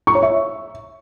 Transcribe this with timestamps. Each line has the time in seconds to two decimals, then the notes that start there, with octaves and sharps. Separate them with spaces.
0.07 C#6
0.15 C#5
0.22 E5